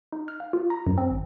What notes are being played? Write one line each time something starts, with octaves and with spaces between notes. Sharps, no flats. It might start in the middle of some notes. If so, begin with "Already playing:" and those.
D#4
F6
F5
F4
A#5
F#2
C4
G#1